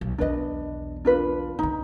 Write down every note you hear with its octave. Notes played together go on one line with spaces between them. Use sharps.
B1
B1 E2 D4 B4 D#5
D4 F4 B4
C#2 D3 D#4